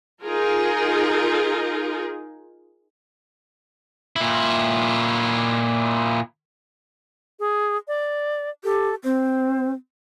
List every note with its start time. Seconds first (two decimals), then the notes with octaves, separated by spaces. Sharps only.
0.23 D#4 F4 G#4 A#4
4.16 A#2 E4
7.39 G#4
7.88 D5
8.64 G4 A4
9.04 C4 C5